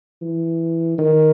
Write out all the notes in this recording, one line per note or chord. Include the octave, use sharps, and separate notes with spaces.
E3
D#3